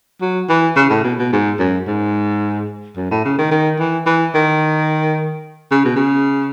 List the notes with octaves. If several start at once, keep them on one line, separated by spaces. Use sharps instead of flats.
F#3
E3
C#3
A2
B2
B2
G#2
F#2
G#2
F#2
A2
C#3
D#3
D#3
E3
E3
D#3
C#3
B2
C#3